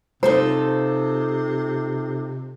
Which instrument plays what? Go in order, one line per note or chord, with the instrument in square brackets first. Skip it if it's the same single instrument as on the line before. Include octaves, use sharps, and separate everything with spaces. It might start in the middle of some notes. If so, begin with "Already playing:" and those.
[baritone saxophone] C3 [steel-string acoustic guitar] D#4 F4 A4 [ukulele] C5